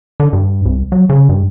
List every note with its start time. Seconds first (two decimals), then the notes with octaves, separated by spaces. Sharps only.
0.20 D3
0.33 G2
0.66 C2
0.92 F#3
1.10 C#3
1.29 G2